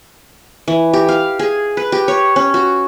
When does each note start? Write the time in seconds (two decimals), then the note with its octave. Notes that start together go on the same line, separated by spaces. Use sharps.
0.68 E3
0.93 G4
1.09 F5
1.39 G#4
1.77 B4
1.92 G4
2.08 C#5
2.36 C#4
2.54 F#4